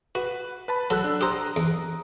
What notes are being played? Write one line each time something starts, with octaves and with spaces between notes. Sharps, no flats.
F#4 B4
B4 A5 B5
F#3 A4 F#5 E6 F#6
D4
G4 C5 A#5 D#6
E2